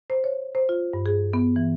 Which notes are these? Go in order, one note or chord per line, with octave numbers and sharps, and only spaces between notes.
C5
C#5
C5
F4
G2
G#4
B3
E3